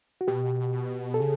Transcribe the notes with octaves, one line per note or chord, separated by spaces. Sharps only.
F#4
B2 G4
A4
C#3 G#4